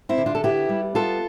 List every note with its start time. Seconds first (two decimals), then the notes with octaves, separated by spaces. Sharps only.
0.09 C4 E4
0.18 D3
0.26 D4 F4
0.35 A4
0.44 B3 E4 G4
0.69 G3
0.95 B3 F4 A4